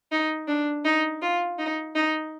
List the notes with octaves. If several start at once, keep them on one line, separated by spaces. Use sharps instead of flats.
D#4
D4
D#4
F4
D#4
D#4